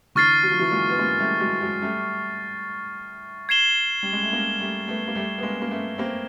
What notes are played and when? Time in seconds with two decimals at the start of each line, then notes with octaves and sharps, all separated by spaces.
0.15 D3 E3 C#6 F6 A6 C7
0.43 F#3
0.51 F3
0.59 E3 F#3
0.71 G#3 A#3
0.89 B3
0.99 G#3 A#3
1.19 G3 A3
1.40 F#3 G#3
1.61 F#3 G#3
1.82 G3 A3
3.49 G#6 C7 E7 G7
4.03 G3
4.13 G#3
4.23 A3
4.32 G#3 A#3
4.59 G3 A3
4.88 A3 B3
5.08 A#3
5.15 G3 A3
5.38 B3
5.43 G#3 A#3
5.62 A#3
5.71 A3 B3
5.98 A#3 C4